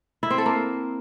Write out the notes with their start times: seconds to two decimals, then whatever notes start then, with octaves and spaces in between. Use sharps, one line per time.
0.23 E4
0.30 C4
0.38 A4
0.46 A#3